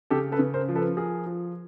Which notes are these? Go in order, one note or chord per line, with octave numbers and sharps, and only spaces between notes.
C#3 G4 A4
A4 B4
C#3
A#4 C5
F3
A4 B4
F3 G#4 A#4
F3